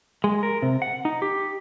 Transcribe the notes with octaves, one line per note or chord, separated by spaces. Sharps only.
G#3
A#4
C3
F#5
D#4
G4